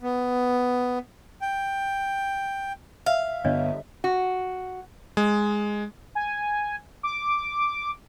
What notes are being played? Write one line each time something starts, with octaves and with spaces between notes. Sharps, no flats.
B3
G5
E5 F5
G2 D3 B3 D4 C#5 D#5
F#4
G#3
G#5
D6